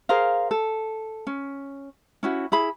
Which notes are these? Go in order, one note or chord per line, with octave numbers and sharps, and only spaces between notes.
G#4 A#4 C5 F5
A4
C#4
C#4 E4 F#4
E4 G#4 B5